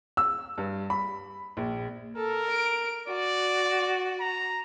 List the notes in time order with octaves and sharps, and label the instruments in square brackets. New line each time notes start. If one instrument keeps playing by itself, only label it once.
[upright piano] E6
G2
B5
A#1
[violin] A4 [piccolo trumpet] A#4
[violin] D7
[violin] F#4 [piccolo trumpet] D5
[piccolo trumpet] A#5